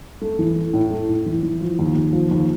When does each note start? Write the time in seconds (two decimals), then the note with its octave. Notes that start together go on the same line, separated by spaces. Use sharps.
0.22 A3
0.39 E3
0.56 A3
0.73 A2
0.91 A3
1.09 A2
1.26 E3
1.43 E3
1.61 F3
1.79 D#2
1.96 D#2
2.13 F3
2.31 D#2